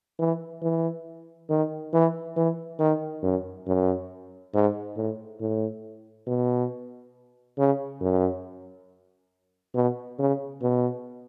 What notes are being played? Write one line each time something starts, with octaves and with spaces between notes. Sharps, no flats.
E3
E3
D#3
E3
E3
D#3
F#2
F#2
G#2
A2
A2
B2
C#3
F#2
B2
C#3
B2